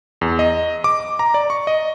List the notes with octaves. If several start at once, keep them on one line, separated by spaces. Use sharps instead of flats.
E2
D#5
D6
A#5
D5
C#6
D#5